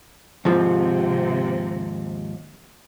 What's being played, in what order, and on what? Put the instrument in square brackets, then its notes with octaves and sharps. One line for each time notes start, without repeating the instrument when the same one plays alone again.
[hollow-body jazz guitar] D#2 G#2 F3 [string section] C3